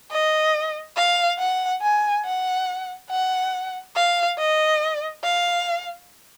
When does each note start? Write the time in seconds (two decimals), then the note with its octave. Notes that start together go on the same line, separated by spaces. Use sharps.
0.11 D#5
0.97 F5
1.39 F#5
1.82 G#5
2.25 F#5
3.11 F#5
3.96 F5
4.39 D#5
5.24 F5